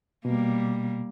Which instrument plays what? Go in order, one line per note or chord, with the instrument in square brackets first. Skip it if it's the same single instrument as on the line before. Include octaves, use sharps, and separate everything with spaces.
[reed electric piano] B2 [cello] G3 A#3